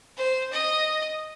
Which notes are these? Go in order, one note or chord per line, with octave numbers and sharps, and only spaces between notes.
C5
D#5